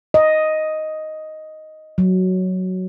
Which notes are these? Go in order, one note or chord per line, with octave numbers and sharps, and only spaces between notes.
D#5
F#3